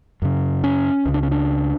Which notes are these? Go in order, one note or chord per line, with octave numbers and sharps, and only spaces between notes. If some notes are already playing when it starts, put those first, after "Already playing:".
F#2 C#3
C#4
C#2 C#3
D4
C#4
D4